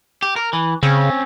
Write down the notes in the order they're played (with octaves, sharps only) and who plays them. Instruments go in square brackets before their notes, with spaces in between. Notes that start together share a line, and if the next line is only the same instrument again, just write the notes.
[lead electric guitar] G4
A#4
E3
[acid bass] C#3 [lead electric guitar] C4 C#4